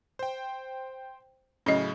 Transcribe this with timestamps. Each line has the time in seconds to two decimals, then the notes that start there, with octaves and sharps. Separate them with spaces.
0.19 C5 G5
1.66 A2 C#3 F#3 C#4 D#5